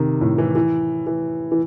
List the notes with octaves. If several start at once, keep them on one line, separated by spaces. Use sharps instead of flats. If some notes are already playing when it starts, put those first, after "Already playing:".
Already playing: C3 D#3
A2
E3
E3
E3
E3